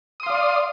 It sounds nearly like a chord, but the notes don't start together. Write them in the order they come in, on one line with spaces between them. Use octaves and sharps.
D#6 C6 F5 D5